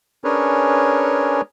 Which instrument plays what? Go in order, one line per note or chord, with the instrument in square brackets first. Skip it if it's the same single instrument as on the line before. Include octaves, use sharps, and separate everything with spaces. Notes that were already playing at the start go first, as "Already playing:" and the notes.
[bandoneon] C#4 D4 G#4 A#4 B4 C#5